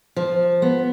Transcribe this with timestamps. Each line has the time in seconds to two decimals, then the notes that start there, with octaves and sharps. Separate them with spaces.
0.16 F3
0.62 B3